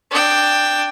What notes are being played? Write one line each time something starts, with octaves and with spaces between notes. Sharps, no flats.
D4 G5